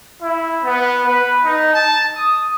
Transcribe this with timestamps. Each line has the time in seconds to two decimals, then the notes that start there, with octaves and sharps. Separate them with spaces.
0.20 E4
0.63 B3
1.06 B4
1.43 D#4
1.74 A5
2.15 D#6